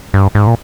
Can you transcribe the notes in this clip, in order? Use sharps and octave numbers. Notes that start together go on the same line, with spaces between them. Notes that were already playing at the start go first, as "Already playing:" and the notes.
G2
G#2
A#2